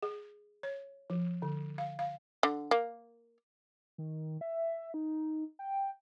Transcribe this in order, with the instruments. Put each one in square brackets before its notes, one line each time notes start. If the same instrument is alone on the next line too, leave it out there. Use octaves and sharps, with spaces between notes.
[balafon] G#4
C#5
F3
D3
F5
F5
[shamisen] D3
A#3
[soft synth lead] D#3
E5
D#4
G5